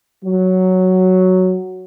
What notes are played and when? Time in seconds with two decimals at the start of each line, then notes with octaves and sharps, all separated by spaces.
0.23 F#3